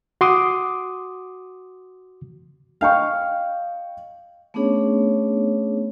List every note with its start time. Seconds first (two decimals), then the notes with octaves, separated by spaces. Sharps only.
0.21 F#4 C6 D6 D#6
2.81 D#5 F5 G5 C#6
4.54 A3 B3 C#4 D4 G#4 C#5